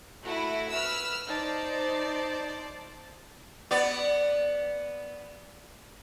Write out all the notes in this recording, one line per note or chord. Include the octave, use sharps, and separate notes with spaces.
A3 E4 F#4
B4 E6 F6
D#4 C5 D5 A5
B3 D5